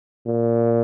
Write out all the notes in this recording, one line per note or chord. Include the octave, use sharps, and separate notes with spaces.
A#2